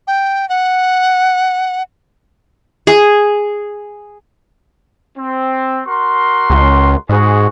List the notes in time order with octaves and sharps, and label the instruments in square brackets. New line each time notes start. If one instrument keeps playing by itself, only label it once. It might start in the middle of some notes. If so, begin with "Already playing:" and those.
[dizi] G5
F#5
[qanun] G#4
[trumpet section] C4
F#4 A#4 C6
[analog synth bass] C#2
[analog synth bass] G#2 [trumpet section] F#4 G#4